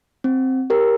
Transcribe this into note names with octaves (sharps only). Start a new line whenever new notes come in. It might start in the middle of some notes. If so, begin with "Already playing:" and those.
C4
G4 A#4